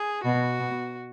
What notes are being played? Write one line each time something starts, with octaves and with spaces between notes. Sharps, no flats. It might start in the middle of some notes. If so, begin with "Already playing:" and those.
Already playing: G#4
B2 F#4
B2